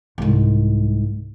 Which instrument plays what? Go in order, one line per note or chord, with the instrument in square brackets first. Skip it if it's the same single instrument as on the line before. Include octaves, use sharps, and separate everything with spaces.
[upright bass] C2 G#2